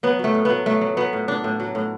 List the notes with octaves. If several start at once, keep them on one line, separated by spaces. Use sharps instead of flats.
F#3 B3
F#3 A3
A2
F#3 B3
F#3 A3
F#3
F#3 B3
A2
A2 D4
A2
F#3
A2